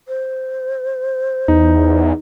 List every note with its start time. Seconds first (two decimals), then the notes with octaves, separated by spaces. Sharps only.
0.08 C5
1.48 E2 D#4